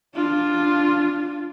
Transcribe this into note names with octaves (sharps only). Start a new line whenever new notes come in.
D4 F4